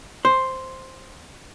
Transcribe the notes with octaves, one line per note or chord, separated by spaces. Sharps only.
C5